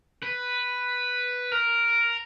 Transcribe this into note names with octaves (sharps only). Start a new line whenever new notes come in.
B4
A#4